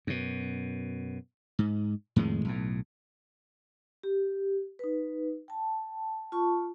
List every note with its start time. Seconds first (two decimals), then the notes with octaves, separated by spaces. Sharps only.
0.07 F#2 B2
1.59 G#2
2.16 F2 A2 D#3 G#3
2.45 B1 A2
4.03 G4
4.79 D#4 B4
5.48 G5 A5
6.32 F4 A5 C#6